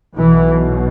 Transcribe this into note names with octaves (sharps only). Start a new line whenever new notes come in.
B1 B2 E3